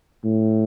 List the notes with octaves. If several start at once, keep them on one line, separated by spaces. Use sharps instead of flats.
A2